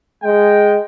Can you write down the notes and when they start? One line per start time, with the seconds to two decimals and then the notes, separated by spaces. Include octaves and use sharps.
0.23 G#3 G5